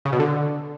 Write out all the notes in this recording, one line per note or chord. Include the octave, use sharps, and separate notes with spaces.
C#3
B2
D3